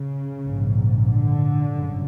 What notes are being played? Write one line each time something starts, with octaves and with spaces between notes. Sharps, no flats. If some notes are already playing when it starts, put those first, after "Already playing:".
Already playing: C#3
A#1 G#2
D3
G1 F#2 C#3